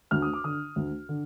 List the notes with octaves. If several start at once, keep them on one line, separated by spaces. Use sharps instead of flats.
D2 F6
D#6
D6
D3 D#6
D2
D3